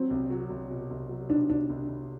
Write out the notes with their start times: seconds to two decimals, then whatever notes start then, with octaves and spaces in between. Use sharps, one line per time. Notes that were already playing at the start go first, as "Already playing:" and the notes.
Already playing: F#3 C4
0.11 C2
0.30 F#3
0.50 C2
0.71 B2
0.91 C2
1.09 F#3
1.29 B2 D4
1.50 C2 D4
1.70 C2
1.89 C2